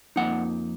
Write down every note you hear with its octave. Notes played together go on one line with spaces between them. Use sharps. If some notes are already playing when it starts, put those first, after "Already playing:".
F2 F3 A#3 D#4 F#5